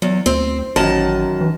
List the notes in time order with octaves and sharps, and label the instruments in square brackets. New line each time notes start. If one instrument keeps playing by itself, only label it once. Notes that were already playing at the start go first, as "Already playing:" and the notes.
[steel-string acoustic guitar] E2 [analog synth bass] F#3
[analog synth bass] D2 [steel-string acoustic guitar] C4
[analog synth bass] A1 [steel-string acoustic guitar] F#2 D#3 A5
[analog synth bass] E3